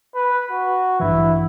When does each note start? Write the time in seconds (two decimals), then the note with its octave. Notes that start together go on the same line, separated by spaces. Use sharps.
0.15 B4
0.51 F#4
1.00 A1 G2 E3 E4